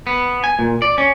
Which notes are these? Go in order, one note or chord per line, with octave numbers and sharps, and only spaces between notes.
B3
G#5
A#2
D5
C#4